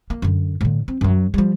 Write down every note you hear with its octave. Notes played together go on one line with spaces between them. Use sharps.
A#3
F#2 D3
A2 D3
C4
F#2 F#3
F3 G3